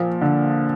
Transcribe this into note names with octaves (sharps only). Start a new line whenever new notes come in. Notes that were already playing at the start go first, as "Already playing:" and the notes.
Already playing: A#2 F3
D3